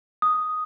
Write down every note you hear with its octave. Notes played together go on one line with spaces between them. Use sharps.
D#6